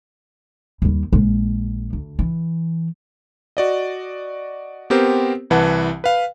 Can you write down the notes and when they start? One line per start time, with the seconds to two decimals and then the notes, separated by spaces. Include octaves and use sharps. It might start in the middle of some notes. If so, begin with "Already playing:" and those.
0.82 D#2 G3
1.13 A#1 G#3
1.93 D2
2.19 E3
3.57 F#4 D5 D#5
4.90 B3 C4 G4 A#4 C5
5.50 C2 E3 B4 F#5 A5
6.04 B4 F5